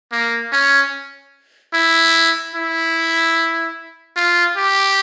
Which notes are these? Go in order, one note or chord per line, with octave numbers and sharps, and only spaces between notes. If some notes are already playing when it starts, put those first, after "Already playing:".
A#3
C#4
E4
E4
F4
G4